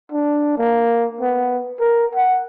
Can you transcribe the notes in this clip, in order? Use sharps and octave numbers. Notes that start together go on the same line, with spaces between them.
D4
A#3
B3
A#4
F#5